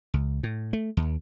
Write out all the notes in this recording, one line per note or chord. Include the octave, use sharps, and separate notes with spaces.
C#2
A2
A3
D#2